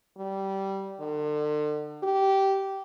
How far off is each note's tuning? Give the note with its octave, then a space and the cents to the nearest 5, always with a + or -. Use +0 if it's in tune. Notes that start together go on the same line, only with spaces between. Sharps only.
G3 -15
D3 +40
G4 -15